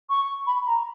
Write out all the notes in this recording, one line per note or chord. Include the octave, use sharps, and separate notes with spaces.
C#6
B5
A#5